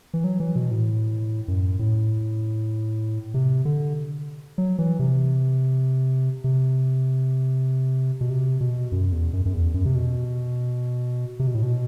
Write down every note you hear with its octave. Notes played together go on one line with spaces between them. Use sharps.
E3
F#3
E3
B2
A2
F#2
A2
C3
D3
F#3
E3
C3
C3
B2
C3
B2
F#2
E2
F#2
F#2
E2
F#2
C3
B2
C3
B2
A2
B2